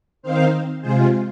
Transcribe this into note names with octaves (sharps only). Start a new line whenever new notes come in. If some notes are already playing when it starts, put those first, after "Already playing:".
D#3 C4 D#4 C5 F5
C3 G#3 F4 G#4 C5